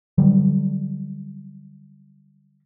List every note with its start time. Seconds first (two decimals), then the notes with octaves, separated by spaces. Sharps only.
0.18 D3 F#3 G3